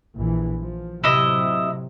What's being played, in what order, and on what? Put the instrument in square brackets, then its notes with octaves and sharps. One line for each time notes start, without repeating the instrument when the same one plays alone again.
[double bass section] A#1 E3
F3
[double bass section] A2 C3 F#3 [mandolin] E4 D#5